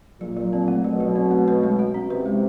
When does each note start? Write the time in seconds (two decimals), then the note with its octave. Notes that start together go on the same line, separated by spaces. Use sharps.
0.21 A#1 A#2 F#3
0.37 F#3
0.53 C4
0.68 A3
0.84 B1 B2 F#3
1.00 F#3
1.16 C4
1.31 A3
1.48 B4
1.63 G#3
1.79 F#4
1.94 C#4
2.10 C2 C3 B4
2.25 G#3